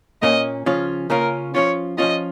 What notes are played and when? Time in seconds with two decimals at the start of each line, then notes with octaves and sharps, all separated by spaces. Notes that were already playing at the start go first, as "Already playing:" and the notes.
0.22 A#2 A#3 C#4 D#5
0.66 C#3 F3 C#4 F4
1.10 C#3 A#3 C#4 F4 A#4
1.54 F3 C#4 F4 C#5
1.98 F3 C#4 F4 D#5